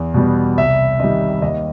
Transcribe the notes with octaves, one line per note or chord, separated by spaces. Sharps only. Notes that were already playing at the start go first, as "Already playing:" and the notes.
Already playing: E2
B2 G3 B3
C2 E5
C3 D#3 G3 D#5
D#2 D#5